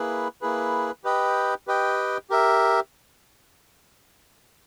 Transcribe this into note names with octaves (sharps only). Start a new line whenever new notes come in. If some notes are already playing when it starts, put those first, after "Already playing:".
Already playing: A#3 E4 G#4 B4
A#3 E4 G#4 B4
G4 B4 D#5 G5
G4 B4 D#5 G5
G4 A#4 E5